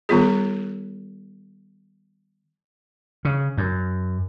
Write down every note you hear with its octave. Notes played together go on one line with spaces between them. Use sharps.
D#3 G3 B3 F4 G#4
C#3
F#2